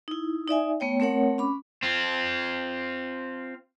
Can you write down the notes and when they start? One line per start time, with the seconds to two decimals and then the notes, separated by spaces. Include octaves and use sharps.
0.08 D#4 E4
0.48 D#4 D5 E5 G#5
0.80 A3 B3 C#5 G5
1.00 A3 C4 A#4 C#5 F#5
1.38 C#4 B5 D6
1.83 C4 F4